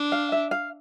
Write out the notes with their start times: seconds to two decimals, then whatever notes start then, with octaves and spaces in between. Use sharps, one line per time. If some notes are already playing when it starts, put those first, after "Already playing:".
Already playing: D4
0.12 F5
0.32 E5
0.51 F5